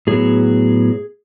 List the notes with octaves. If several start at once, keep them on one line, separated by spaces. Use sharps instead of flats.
A2 F#3 B3 G#4